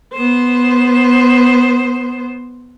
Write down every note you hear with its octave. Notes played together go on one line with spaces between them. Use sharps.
B3 C5